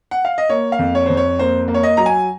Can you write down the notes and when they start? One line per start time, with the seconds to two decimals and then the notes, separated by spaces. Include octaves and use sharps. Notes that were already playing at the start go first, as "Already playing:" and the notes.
0.11 F#5
0.25 F5
0.38 D#5
0.49 A#3 C#5
0.72 F5
0.79 F2
0.95 C#5
1.06 F2 C5
1.17 C#5
1.39 A#3 C5
1.68 A#3
1.74 C#5
1.83 D#5
1.97 F#3 A#5
2.06 G#5